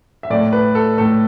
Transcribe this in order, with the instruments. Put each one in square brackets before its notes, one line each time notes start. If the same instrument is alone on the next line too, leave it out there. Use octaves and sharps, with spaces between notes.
[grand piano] E5
A2 A3 D5
B4
A4
A2 A3 A4